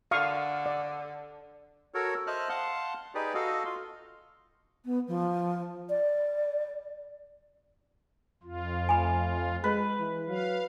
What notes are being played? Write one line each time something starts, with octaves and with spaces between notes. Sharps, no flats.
D3 F5 C#6 D#6
D5
F#4 A4 A#4 C#5
C5 D#5 E5 A5 F6 F#6
F5 F#5 A5 C6
D#4 G4 G#4 B4 D5
F#4 A4 D#5 F5
F4 C6
B3
F3
D5
F2 F4
A3 G#5 B5
G#3 B4
E3
F#3 F5